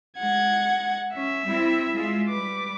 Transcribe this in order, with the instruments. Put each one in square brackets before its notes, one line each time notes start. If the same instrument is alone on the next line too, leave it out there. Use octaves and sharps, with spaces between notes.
[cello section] G#3 [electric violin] F#5 G#6
[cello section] C#4 [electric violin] E5
[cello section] G3 C4 E4
G#3 F4 G#4
[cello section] G3 B4 [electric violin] D6